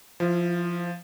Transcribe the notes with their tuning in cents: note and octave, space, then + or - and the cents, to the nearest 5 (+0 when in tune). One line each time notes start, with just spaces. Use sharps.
F3 -5 E4 +25